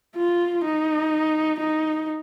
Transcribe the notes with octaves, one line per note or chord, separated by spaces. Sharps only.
F4
D#4
D#4